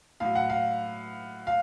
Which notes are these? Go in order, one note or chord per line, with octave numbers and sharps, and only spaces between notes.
A2 F#3 F5
F#5
F5
F5